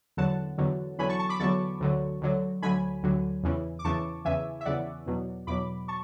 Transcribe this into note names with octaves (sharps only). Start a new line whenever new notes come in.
E2 D3 F#3 F#5 A5
E2 D3 F#3
E2 D3 F#3 G#5 B5
A5 C#6
A5 C#6
B5 D6
E2 D3 F#3 A5 C#6
D2 D3 F#3
D2 D3 F#3
D2 D3 F#3 G#5 B5
D2 D3 F#3
E2 C#3 E3
D6
E2 C#3 E3 A5 C#6
E2 C#3 E3 E5 G#5
E5
E2 C#3 E3 D5 F#5
E2 B2 F#3
E2 B2 F#3 B5 D6
A5 C#6